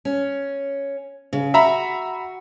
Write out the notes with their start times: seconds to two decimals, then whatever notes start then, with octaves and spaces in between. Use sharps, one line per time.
0.05 C#4
1.33 C#3
1.54 F#4 E5 A#5 B5